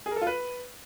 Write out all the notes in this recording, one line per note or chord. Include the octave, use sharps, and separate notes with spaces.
G#4
A#4
A4
F4
B4